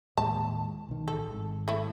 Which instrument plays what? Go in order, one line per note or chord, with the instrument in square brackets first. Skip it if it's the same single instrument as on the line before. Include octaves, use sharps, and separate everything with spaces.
[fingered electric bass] D#2 A2 G#3 [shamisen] A5
[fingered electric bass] B1 D#3
[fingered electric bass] A1 [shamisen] A4
[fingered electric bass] G#1 G#2
[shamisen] A3 E4